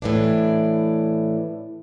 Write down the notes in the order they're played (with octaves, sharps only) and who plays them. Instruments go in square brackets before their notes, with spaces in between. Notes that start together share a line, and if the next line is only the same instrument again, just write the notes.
[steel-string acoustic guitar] A2 E3 D4